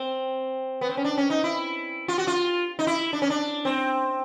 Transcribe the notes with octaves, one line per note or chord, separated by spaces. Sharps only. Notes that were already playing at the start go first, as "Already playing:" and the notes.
Already playing: C4
B3
C4
C#4
D4
C#4
D#4
E4
F4
F#4
F4
D#4
E4
D4
C#4
D4
C4